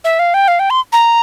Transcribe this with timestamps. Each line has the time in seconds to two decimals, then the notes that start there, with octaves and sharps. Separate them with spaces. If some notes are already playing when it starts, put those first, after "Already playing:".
0.04 E5
0.19 F5
0.34 G5
0.48 F5
0.59 G5
0.70 C6
0.92 A#5